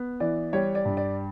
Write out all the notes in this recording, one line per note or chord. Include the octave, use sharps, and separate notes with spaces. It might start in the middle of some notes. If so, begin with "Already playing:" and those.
Already playing: B3
E3 D5
G3 C#5
D5
G2
D5